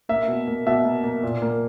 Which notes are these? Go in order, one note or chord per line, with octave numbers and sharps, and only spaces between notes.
A#3 E5
B2
A#3
B2 E5
A#3
A#3
A#2
A#3